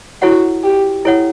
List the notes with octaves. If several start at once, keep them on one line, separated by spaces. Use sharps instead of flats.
E4 F#4 A4 C#5 F#5
G4
E4 A4 C#5 F#5